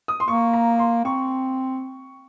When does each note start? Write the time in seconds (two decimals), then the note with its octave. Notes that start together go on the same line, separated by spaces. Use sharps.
0.08 D#6
0.20 C6
0.28 A#3 C#6
0.53 A#5
0.79 C6
1.05 C4 C#6